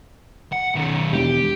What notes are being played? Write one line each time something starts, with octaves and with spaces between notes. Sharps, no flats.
F#5
B1 D#3
E1 G4